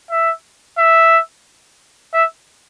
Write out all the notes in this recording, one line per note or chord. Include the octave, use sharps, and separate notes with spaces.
E5
E5
E5